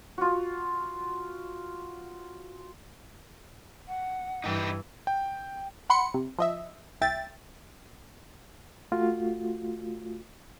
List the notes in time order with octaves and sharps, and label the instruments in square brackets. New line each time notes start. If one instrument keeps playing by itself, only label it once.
[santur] F4 F#4
[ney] F#5
[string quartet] G2 E3 [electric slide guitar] D#4 G4 B4
[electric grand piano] G5
[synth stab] F#5 B5 C6 C#7
C3
F3 D#5 E5
C2 E5 G5 A6
[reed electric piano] A3 F4 F#4